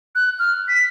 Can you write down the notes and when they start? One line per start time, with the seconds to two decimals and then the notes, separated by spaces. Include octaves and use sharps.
0.15 F#6
0.39 F6
0.68 B6